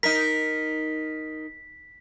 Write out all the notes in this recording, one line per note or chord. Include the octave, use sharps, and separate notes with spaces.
D#4 A#4 B6